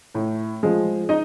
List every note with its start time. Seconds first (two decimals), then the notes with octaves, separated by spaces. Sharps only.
0.15 A2
0.63 F3 G#3
1.09 D#4 D#5